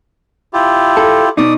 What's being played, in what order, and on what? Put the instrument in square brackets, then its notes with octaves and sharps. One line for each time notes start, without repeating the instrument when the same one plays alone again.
[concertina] E4 F4 G4
[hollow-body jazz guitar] A4
[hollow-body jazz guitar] B2 D#4 [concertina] D5 D#6